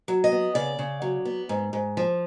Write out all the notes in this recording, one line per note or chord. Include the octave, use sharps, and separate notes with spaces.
F#3
D#5
B3
C#3 D5
C#3
F#3
B3
G#2
G#2
F3